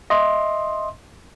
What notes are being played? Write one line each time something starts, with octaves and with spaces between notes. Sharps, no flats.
D#5 E5 C6